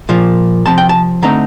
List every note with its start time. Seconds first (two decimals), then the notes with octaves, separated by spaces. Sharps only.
0.09 A#2 F3 A#3
0.66 C3 F3 C4 A5
0.78 G5
0.89 A5
1.23 D3 A3 C4 D#4 A#5